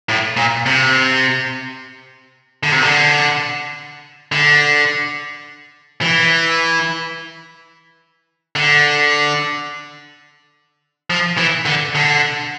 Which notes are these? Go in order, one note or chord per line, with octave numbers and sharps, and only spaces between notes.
A2
A#2
C3
D3
C3
D3
D3
E3
D3
F3
E3
D3
D3